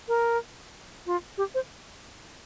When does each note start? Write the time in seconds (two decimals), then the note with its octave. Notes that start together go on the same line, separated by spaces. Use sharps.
0.08 A#4
1.06 F4
1.38 G4
1.55 C5